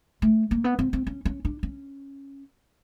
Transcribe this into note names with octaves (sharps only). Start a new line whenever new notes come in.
A3
A#3
B3
C4
C4
C#4
C#4
D4
C#4